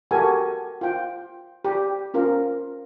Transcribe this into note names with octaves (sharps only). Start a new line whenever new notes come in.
F#4 G4 A4 A#4 G#5
F4 G5
G4
C#4 F4 A#4